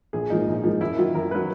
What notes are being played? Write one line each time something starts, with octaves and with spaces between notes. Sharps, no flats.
A#1 G#4
G#2 F3 A#3 D#4
A#1
G#2 F3 A#3
F#2 E4
D#3 F#3 F4
F#2 A#4
D#3 F#3 B4